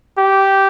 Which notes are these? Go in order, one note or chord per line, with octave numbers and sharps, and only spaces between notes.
G4